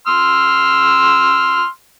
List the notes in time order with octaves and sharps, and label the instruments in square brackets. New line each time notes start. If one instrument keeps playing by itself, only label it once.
[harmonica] C6 E6 F6